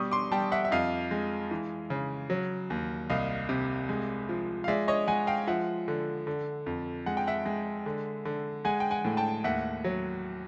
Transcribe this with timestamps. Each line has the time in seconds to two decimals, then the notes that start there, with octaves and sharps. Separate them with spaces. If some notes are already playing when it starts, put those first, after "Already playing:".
Already playing: B2 G3 C#6 D#6
0.11 C6 D6
0.31 G3 G5 A5
0.52 E5 F#5
0.65 E5
0.71 F2 D#5 F5
1.11 G#3
1.51 E3
1.90 C#3
2.30 F#3
2.70 D#2
3.10 C2 D#5 F5
3.49 C3
3.89 G#3
4.29 F3
4.64 F5
4.68 G#3 D5 E5
4.88 C#5 D#5
5.07 G#3 F#5 G#5
5.27 F5 G5
5.47 F3 E5 F#5
5.88 D3
6.27 D3
6.66 F2
7.06 G#3 F#5
7.17 G5
7.27 E5 F#5
7.46 G#3
7.86 D3
8.25 D3
8.65 G#3 F#5 G#5
8.80 G5
8.91 F#5 G#5
9.05 A2
9.17 G5 A5
9.44 D#2 E5 F#5
9.84 F#3